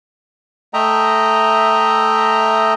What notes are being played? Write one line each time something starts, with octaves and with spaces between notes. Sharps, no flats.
A3 D#5 E5 G5 A#5